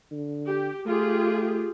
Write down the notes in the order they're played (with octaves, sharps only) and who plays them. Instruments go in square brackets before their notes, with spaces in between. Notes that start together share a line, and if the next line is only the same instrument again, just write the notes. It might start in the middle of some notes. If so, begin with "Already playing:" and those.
[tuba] D3
[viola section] G4
[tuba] A3 [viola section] F4 G4 G#4